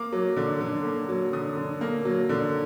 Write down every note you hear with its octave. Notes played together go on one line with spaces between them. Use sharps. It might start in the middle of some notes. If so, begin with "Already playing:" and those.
Already playing: A#3 D6
F#3
D3
D3
A#3
F#3
D3 D#6
D3
A#3
F#3
D3